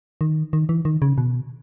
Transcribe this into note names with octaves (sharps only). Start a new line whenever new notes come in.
D#3
D#3
E3
D#3
C#3
B2